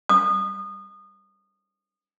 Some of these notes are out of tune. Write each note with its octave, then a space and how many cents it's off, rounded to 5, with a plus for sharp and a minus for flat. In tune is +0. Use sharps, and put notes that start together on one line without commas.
D#6 -25